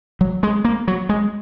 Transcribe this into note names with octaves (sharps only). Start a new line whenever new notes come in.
F#3
G#3
A#3
F#3
G#3